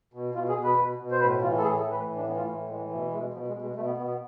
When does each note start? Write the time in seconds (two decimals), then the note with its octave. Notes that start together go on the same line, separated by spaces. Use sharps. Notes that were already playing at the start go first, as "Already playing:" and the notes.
0.14 B2
0.35 B2 F4
0.49 G#4
0.56 B2
0.63 B4
0.78 B2
0.99 B2
1.11 C5
1.20 A2 B4
1.41 E3 F4
1.58 A4
1.62 A2 G#4
1.77 A4
1.84 E3
1.91 B4
2.05 A2
2.16 D4
2.27 E3 B3
2.37 F4
2.47 A2 A3
2.69 E3 G#3
2.90 B2 F3
3.12 B2 G#3
3.33 B2 F3
3.48 G#3
3.54 B2
3.62 G#3
3.76 B2 A3
3.86 B3
3.97 B2 B3
4.08 B3